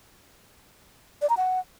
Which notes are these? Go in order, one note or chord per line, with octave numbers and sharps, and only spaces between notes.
D5
A#5
F#5